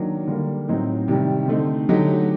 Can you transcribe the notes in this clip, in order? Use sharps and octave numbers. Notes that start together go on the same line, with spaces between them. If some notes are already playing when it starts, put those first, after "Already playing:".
Already playing: D#3 F#3 A#3 D4
D3 G3 A#3
A2 F#3 C4 D#4
C3 D#3 G3
D3 A3 C4 D#4
D3 F#3 A3 D#4 G4